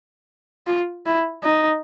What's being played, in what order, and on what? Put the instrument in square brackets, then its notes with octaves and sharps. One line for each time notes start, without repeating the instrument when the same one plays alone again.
[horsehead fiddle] F4
E4
D#4